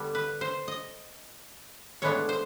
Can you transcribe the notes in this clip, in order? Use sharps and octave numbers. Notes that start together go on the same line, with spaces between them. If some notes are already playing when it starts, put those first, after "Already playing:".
Already playing: D3 G3 B3 D4
B4
C5
D#5
A2 E3 G#3 B3 D4 C#5
C5